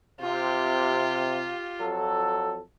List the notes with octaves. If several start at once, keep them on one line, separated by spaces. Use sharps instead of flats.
C3 F4 G4
F2 F#3 A4